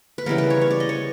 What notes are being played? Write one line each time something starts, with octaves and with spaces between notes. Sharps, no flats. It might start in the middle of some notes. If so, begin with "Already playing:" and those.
B4
C#3 E3 G3 B3 A#4
B4
C#5
C#5
D5
D#5
C#5